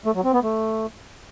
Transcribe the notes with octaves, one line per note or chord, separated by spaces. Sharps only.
A3
F#3
C4
B3
A3